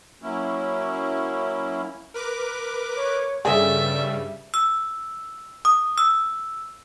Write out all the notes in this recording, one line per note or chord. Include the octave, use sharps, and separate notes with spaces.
F#3 A#3 C#4 E4
A#4 B4 D6
C#5
G2 C#3 G3 C#4 G#4 A4 E5
E6
D#6
E6